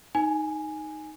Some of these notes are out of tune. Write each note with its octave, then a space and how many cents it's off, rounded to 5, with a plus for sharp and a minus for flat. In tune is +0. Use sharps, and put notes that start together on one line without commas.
D#4 +0 G#5 +0